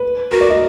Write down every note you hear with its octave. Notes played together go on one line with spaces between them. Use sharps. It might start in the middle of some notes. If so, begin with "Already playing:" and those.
Already playing: B4
F#4 A#4
D5
D#5